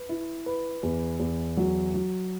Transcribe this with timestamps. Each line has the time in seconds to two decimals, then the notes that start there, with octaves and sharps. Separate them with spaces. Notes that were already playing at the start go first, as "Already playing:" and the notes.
Already playing: B4
0.09 E4
0.46 B4
0.83 E2
1.20 E2
1.57 F#3
1.94 F#3